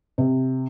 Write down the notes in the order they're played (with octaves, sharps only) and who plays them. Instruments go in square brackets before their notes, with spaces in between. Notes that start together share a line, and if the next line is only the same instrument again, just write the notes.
[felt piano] C3